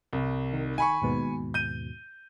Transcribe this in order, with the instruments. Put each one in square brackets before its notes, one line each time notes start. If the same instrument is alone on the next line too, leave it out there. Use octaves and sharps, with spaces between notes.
[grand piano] C2
[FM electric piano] D#3
[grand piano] G#5 B5 C#6
[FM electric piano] D#2 G#2 B2
[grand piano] G6 D#7